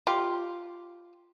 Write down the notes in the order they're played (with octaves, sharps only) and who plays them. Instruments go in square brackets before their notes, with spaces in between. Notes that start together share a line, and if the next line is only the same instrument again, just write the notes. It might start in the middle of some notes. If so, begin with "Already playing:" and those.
[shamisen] F4 G4